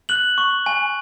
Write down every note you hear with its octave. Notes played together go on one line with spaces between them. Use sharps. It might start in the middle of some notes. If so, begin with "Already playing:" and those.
F#6 F#7
C#6
G#5